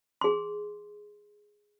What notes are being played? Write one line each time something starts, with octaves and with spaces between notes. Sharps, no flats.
G#4 C6